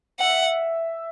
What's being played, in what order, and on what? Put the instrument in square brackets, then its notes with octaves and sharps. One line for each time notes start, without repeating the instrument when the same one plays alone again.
[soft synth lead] E5 [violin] F#5